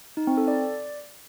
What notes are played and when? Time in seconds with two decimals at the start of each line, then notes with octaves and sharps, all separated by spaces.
0.17 D#4
0.27 C4
0.37 A4
0.48 D5